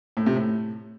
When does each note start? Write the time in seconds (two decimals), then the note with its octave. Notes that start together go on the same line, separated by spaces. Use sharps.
0.17 A2
0.26 C3
0.36 A2